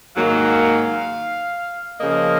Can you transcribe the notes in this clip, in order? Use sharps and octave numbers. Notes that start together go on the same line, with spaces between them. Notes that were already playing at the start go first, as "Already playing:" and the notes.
G#2 D#3 F#3 A#3 F5
C#3 F3 A#3 D#5